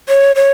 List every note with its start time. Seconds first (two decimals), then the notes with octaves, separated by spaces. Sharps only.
0.09 C#5
0.36 C#5